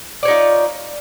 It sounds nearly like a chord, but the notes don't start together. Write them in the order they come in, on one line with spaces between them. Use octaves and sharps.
D5 C#5 D#4 F4